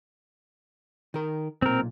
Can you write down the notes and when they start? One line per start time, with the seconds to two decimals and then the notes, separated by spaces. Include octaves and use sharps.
1.14 D#3 A#4
1.62 B1 A#2 C4 A#4